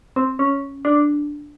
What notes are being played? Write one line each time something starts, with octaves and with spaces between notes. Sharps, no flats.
C4
C#4
D4